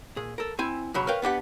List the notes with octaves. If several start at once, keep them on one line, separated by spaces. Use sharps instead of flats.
A#2 G#4
A4 A#4
C4 E4 G#5
B1 C#3 F#3 C#5 B5
A#4 B4 C#5 F5 G5
B3 D4 G4 F#5